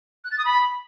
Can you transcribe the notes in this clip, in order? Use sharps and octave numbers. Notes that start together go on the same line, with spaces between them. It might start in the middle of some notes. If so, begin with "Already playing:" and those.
F#6
A6
D#6
B5